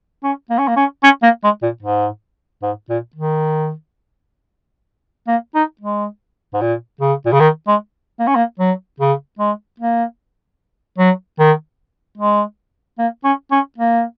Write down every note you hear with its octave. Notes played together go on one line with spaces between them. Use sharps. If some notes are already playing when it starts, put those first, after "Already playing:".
C#4
A#3
C#4
A#3
C#4
C#4
A#3
G#3
A#2
G#2
G#2
A#2
D#3
A#3
D#4
G#3
G#2
A#2
C#3
A#2
C#3
D#3
G#3
A#3
C#4
A#3
F#3
C#3
G#3
A#3
F#3
D#3
G#3
A#3
C#4
C#4
A#3